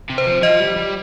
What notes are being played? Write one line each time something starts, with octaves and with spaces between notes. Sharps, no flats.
C3
C5
F3
F3 D#5
G3
G3